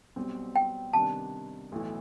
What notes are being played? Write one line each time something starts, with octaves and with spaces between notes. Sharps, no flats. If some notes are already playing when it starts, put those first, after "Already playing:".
B1 B2 G3 C4
G5
C3 D#3 G3 B3 D4 A5
B1 A2 E3 A3